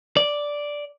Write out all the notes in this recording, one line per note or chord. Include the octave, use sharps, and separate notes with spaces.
D5